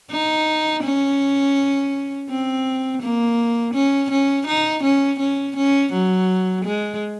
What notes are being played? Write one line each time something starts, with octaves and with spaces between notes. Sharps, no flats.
D#4
C#4
C4
A#3
C#4
C#4
D#4
C#4
C#4
C#4
F#3
G#3